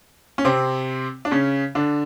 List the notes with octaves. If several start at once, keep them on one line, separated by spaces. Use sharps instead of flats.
C#4
C3 C4
D4
C#3 C#4
D3 D4